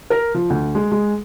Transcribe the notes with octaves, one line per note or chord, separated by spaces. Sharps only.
A#4
F3
D2
G#3
G#3